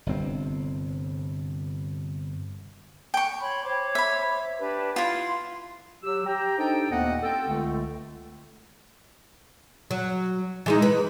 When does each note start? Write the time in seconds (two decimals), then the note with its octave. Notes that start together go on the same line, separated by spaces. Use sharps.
0.06 G1 G2 C3 C4
3.14 G5 C#6
3.39 C#5 B5 C6
3.63 C5 C#5 D6
3.95 E5 B5
4.58 D4 G4 B4
4.96 E4 F4 F5 C6
6.03 F#3 G4 E6
6.26 G4 G5 A#5
6.58 D4 D#4 A4 C5 G5
6.91 D#2 A#2 A3 B3 D#5 F#5
7.23 C4 A4 G5
7.48 C#2 D3 A3
9.91 F#3
10.66 E3 G#3 D#4
10.82 B4